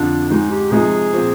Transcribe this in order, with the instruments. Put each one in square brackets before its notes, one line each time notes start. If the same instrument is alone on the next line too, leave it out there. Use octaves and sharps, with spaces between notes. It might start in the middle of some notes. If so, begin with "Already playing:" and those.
Already playing: [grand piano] F2 D3 F3 [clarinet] D4
[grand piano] G#2 D#3 G#3 [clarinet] D#4
[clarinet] G4
[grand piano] C3 F3 G#3 D#4 [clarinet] G#4
[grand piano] A#2 F3 C4